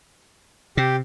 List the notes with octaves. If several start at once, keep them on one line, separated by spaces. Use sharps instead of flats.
C3 G4